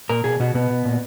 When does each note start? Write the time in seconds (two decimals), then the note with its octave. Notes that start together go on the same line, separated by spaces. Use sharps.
0.09 A#2 A#4
0.24 B2 G#4
0.40 B2 F#4
0.54 B2 B3
0.70 B2
0.85 A#2